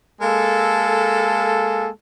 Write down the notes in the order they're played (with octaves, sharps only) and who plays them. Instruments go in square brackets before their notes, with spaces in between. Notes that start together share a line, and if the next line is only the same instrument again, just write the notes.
[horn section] G#3 A#3 A4